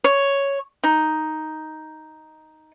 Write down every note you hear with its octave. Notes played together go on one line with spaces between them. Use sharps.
C#5
D#4